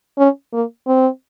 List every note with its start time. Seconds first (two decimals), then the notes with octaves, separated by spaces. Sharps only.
0.18 C#4
0.53 A#3
0.87 C4